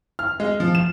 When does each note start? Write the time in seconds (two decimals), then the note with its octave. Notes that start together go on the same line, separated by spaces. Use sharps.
0.19 F6
0.40 G#3
0.60 F3
0.75 E7